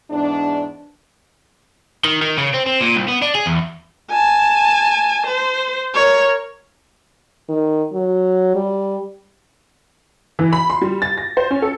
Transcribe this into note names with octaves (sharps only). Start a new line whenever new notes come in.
E2 G#2 D4
D#3
D#3
C#3
C4
C4
A#2
C2
B3
D4
G#4
E2
G#5 A5
C5
A#4 C#5
D#3
F#3
G3
E3
B5
C6
G3
A6
A#6
C5
C#4
A4